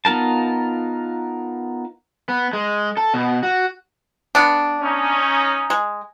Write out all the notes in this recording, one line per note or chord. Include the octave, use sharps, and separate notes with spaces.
B3 D#4 F4 A#4 A5
B3
G#3
A4
B2
F#4
B3 D4
C#4 D#4
G#3